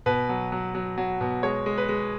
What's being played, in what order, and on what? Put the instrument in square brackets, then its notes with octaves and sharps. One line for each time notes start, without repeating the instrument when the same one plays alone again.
[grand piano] B2 B4
F#3
F#3
F#3
F#3
B2
G#3 C#5
G#3
B4
G#3